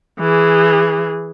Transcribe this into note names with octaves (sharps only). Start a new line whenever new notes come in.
E3 G#4